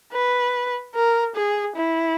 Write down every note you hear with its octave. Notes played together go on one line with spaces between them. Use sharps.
B4
A#4
G#4
E4